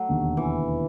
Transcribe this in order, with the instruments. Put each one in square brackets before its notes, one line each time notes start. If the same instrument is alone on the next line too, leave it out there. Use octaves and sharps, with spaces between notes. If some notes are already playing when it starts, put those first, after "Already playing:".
Already playing: [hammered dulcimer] F#3 A3
[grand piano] E1 D#2 D3
[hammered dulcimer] E3